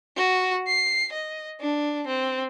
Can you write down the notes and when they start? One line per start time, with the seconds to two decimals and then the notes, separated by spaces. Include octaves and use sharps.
0.17 F#4
0.67 C7
1.12 D#5
1.61 D4
2.07 C4